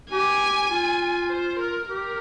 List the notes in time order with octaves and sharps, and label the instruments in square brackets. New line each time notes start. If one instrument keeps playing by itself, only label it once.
[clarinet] G4 [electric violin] G#5
[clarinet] F4
[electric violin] C5
A#4
[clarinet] G4 [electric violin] A#4